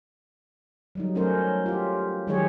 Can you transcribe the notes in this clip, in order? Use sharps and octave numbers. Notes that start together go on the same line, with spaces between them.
F#3 G3 D#4
F#3 A3 C#4 D#4 A#4 C5
F4 G4
D#3 F#3 G#3 G4 G#4 C#5